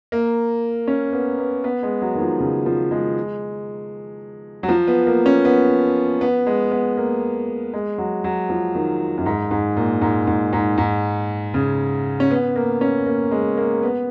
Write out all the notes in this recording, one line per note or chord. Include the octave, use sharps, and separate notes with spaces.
A#3
C#4
B3
B3
B3
G#3
F#3
D#3
F3
C#3
F3
G#3
F#3
F3
B3
A#3
C#4
B3
B3
G#3
B3
A#3
G#3
F#3
F#3
F3
D#3
F#2
G#2
G#2
A#2
G#2
G#2
G#2
G#2
C#3
C#4
B3
A#3
C#4
A#3
G#3
A#3
B3